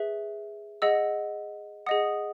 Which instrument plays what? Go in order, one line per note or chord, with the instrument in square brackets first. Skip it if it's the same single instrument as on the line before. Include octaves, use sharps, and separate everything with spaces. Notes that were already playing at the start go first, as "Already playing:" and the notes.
Already playing: [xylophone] G#4 B4 E5
G#4 D#5 F#5 E6
G#4 D#5 F#5 D#6